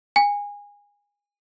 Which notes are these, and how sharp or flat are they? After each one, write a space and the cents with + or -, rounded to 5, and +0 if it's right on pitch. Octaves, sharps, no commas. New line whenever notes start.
G#5 -25